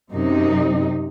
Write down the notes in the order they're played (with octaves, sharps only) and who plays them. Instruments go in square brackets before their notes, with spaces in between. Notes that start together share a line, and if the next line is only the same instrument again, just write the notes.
[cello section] F#2 C3 D#4